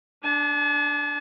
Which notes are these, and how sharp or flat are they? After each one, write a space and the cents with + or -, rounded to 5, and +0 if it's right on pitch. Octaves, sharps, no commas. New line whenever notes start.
D4 +0 A5 -45